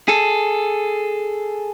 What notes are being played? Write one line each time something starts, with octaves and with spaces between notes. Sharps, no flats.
G#4 A4